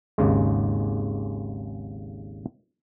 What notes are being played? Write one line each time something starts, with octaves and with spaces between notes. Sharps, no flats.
G#1 D#2 C#3 G#3